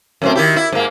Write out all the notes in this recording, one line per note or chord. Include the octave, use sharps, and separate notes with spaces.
F#2 A2 C4
D#3 E4 G4
E4
G#2 A#3